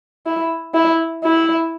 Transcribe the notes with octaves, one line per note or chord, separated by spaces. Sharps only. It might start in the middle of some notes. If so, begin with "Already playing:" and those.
E4
E4
E4